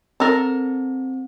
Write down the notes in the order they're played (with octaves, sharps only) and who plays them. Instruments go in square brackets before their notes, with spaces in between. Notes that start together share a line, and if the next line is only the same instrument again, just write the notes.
[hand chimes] C4 [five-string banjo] A4 A#4